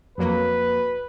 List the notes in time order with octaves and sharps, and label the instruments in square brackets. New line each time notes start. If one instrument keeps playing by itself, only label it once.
[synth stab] F2 F#3 A#3 [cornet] B4